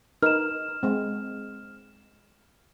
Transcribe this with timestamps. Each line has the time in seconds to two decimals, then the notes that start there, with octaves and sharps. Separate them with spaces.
0.22 D#4 A#4 B4 F6 E7
0.83 G#3 C4